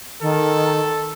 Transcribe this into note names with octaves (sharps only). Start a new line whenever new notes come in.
D#3 A4